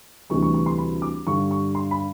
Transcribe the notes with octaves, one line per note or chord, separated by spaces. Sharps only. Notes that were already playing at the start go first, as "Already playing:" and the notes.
D2 C3 E3 G3 C#6
C#6
C#6
C6
B5
D6
G2 D3 G3 C#6
C#6
C6
B5